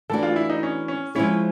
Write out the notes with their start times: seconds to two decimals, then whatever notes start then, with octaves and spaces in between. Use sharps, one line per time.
0.10 E3 A3 D4 F#4 A4
0.23 F4
0.36 E4
0.50 D#4
0.63 C#4
0.88 C#4
1.15 F3 G#3 C4 C#4 E4 G#4